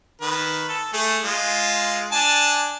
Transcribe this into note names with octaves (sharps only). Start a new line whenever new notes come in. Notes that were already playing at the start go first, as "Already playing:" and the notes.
D#3 B4
A4
A3 G#4
G#3 F4
D4 G#5 A5